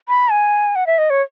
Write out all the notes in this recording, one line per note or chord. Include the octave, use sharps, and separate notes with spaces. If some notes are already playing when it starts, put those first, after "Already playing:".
B5
G#5
F#5
E5
D#5
C#5